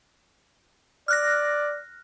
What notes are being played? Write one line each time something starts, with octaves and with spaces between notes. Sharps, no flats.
D5 F6 F#6 A#6